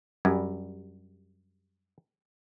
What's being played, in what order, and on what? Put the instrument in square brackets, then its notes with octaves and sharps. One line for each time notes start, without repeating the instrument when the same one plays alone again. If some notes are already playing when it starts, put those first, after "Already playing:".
[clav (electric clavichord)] F#2 [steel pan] G3